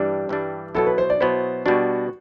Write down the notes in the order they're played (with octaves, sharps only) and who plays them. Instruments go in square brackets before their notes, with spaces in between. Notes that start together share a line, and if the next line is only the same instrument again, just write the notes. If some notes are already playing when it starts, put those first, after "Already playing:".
Already playing: [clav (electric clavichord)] G2 E3 G3 D4 [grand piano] G4
[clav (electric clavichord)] G2 E3 G3 D4
[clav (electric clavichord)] B2 F#3 B3 E4 [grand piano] A4
[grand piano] B4
C5
D5
[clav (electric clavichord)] B2 F#3 B3 E4 [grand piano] C5
[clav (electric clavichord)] B2 G3 D4 [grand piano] F#4